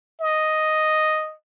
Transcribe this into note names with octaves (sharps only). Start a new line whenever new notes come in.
D#5